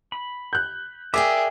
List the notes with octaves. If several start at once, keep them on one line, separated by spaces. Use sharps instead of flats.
B5
F#6 G6
G#4 A#4 D5 E5 G5 D6